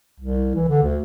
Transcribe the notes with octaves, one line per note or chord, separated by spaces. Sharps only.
C2
E3
D3
D2